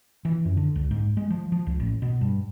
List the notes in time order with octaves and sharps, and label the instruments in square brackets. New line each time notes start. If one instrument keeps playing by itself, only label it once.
[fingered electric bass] E3
F#2
D3
C#2
G#2
G#3
F3
F3
C#2
A1
B2
G2